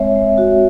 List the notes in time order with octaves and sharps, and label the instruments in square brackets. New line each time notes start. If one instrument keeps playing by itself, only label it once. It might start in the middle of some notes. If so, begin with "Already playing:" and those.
Already playing: [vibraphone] G#3 C4 C#5 E5
G#3
F#4